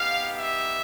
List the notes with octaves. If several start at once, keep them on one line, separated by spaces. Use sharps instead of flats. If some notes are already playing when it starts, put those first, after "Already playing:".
Already playing: B3 D#4 G4 F5
E5